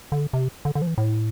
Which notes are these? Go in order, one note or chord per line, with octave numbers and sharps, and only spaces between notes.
D3
C3
D3
D3
F3
E3
A2